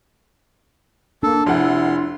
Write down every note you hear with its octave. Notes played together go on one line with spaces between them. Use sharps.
A#3 D4 A4
F1 E4 F#5 C6